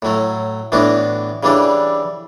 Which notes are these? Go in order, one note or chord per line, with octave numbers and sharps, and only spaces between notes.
A2 F#3 A3
A2 E3 B3 D4 F#4
C#3 E3 G3 D4 A4